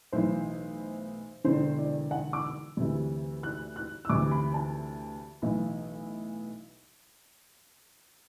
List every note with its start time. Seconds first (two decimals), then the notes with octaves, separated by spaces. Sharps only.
0.12 B1 A2 E3 C5
1.44 E1 E2 D3 C5
1.78 D5
2.11 F#5
2.33 D6
2.44 E6
2.77 D2 C3 E3
3.43 F#6
3.76 F#6
4.05 E6
4.09 D2 C3 E3 D6
4.31 B5
4.54 A5
5.42 B1 A2 E3